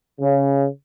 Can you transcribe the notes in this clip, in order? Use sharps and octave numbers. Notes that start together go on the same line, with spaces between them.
C#3